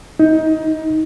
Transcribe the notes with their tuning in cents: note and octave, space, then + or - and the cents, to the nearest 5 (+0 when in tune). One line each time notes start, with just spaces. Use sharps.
D#4 +25